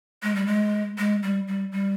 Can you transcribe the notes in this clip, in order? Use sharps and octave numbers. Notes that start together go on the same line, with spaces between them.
G#3
G3
G#3
G#3
G3
G3
G3